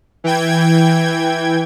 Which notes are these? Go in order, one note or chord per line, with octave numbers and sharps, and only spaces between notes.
E3 G5 G#6